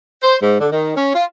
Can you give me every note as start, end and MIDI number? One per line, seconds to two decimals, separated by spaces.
0.23 0.36 72
0.43 0.58 44
0.60 0.68 50
0.72 0.94 51
0.96 1.12 61
1.15 1.24 65